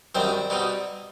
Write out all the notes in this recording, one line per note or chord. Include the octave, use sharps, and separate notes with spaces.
F#2 D#3 G3 C4 C5
B2 G3 C4 D#4